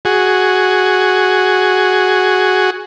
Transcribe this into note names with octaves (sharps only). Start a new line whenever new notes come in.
F#4 G#4